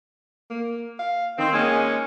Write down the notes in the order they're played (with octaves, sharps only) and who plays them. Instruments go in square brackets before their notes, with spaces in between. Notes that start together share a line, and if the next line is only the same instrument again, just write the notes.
[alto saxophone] A#3
F5
[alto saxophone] D#3 [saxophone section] C4
[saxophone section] G#3 C#4 D#4 [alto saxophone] A#3